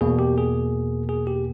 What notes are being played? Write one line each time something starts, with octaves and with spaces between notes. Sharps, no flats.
E2 B2 A#3 G#4
G4
G#4
G#4
G4